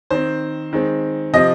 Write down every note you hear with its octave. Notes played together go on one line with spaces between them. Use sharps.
D#3 C4 C5
D#3 G#3 C4
C3 F3 C4 D#5